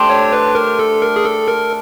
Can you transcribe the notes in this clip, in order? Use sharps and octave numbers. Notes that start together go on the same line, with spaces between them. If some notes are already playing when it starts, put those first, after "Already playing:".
Already playing: A3 D4 G4 C5
C#5
B4
A#4
A4
A#4
G#4
A4
A#4